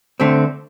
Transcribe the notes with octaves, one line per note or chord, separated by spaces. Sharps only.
D3 A3 C4